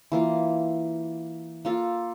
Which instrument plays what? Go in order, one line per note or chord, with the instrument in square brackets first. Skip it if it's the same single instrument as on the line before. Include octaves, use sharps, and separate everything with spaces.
[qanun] E3 A#3 F4
A#3 F4 A4